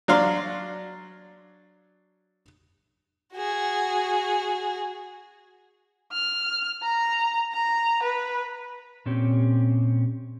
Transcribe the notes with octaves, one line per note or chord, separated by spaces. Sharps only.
F#3 D4 F5 C6
F#4 G#4
F6
A#5
A#5
B4
A#2 C4 C#4 G4